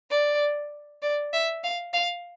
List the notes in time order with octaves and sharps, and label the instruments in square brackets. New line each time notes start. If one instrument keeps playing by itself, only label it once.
[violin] D5
D5
E5
F5
F5